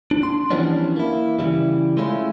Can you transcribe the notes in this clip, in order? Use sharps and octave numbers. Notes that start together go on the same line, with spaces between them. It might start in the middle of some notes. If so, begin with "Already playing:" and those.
D4
C6
E3 F3 G3 B3 C#4 D4
A#3 E4
C#3 E3 G3
G#3 A3 C#4 E4 F4